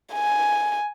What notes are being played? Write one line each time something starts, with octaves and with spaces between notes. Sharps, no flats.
G#5